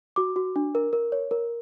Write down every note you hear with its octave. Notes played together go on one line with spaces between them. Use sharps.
F#4 D6
F#4
D4
A#4
A#4
C#5
A#4